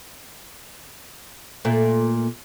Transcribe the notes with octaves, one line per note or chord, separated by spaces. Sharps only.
A#2 A3